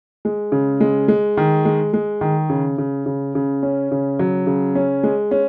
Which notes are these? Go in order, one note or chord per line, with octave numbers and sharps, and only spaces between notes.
G#3
C#3
G#3
G#3
D#3
G#3
G#3
D#3
C#3
C#3
C#3
C#3
C#4
C#3
F#3
C#3
C#4
G#3
C#4